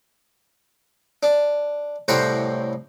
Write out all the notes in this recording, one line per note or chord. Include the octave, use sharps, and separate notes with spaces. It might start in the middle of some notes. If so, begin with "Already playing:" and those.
D4
C2 A2 F#5 G5 A#5 C6